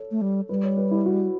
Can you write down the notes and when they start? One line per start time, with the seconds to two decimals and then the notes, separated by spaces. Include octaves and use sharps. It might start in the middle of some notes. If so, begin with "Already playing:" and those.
Already playing: A4 C#5
0.11 A3
0.21 G3
0.49 G3 B4
0.63 C#5
0.77 B4
0.91 E4
1.06 F#4